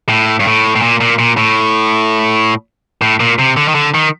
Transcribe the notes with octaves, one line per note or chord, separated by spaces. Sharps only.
A2
G2
A2
A2
A#2
A#2
A#2
A2
A2
A#2
C3
D3
D#3
D3
D#3